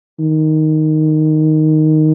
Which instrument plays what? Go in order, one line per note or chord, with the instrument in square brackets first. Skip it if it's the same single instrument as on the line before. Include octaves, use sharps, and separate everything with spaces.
[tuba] D#3